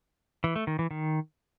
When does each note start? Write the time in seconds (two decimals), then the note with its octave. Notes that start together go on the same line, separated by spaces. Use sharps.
0.44 E3
0.56 A3
0.67 D#3
0.79 E3
0.91 D#3